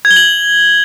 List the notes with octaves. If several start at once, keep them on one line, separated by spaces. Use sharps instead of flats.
G#6
G7
F#7